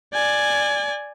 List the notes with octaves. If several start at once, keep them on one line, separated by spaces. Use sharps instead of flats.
D5 G#5